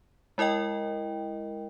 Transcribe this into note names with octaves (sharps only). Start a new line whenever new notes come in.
G#3 E4 A#4 D#5 G5